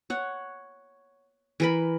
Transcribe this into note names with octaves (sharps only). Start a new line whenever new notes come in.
C#5 F#5
E3 A#4 B5